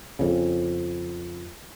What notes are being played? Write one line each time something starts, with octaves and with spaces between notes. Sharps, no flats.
F2 C#3